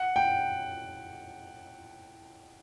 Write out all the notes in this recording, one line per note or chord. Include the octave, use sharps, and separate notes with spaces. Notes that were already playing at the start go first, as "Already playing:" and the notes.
Already playing: F#5
G5